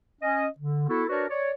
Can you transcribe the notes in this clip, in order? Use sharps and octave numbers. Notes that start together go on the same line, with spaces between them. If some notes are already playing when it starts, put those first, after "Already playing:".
C#4 D#5
D3
B3 E4 F#4 A4
D4 F#4 A#4 B4 C#5 D5
C#5 D5